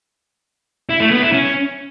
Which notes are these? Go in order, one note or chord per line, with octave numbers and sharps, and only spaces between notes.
E4
A3
B3
E4
C#4